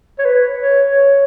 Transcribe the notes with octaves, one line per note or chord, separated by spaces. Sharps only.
C#5
B4
C#5
C#5